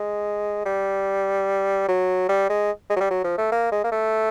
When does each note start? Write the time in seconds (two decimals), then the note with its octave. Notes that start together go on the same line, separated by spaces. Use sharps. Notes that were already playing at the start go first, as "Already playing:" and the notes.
Already playing: G#3
0.65 G3
1.88 F#3
2.29 G3
2.49 G#3
2.90 G#3
2.96 F#3
3.00 G3
3.10 F#3
3.24 F3
3.38 A3
3.52 A#3
3.72 G#3
3.84 A#3
3.92 A3